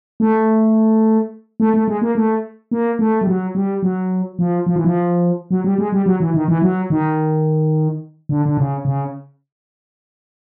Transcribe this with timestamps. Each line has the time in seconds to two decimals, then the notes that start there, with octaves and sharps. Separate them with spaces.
0.20 A3
1.60 A3
1.74 A3
1.88 G#3
2.02 A#3
2.15 A3
2.71 A#3
2.99 A3
3.21 G3
3.27 F#3
3.55 G3
3.83 F#3
4.39 F3
4.66 F3
4.76 E3
4.85 F3
5.51 F#3
5.64 G3
5.78 G#3
5.92 G3
6.06 F#3
6.20 E3
6.34 D#3
6.48 E3
6.62 F#3
6.90 D#3
8.29 D3
8.46 D3
8.58 C#3
8.85 C#3